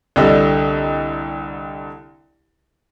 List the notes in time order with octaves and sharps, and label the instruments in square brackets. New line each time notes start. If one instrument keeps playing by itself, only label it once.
[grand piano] C2 D3 G3 D#5 E6